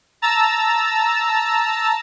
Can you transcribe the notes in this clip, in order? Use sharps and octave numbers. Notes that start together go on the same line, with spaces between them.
A5 A#5 E6 A6